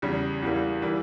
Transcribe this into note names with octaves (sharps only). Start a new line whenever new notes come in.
E2 C#3 G3
E2 E3 G3 A#3
E3 G3 A#3